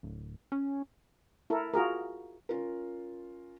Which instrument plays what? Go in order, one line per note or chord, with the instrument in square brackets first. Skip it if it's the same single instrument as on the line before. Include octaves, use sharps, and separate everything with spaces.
[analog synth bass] D1
C#4
[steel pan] E4 A4 A#4
F4 F#4 G#4 A#4
[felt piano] C#4 F4 A#4